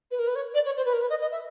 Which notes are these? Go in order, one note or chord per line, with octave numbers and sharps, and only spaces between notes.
B4
A#4
B4
C#5
D5
C#5
C5
B4
A#4
B4
D#5
D#5
E5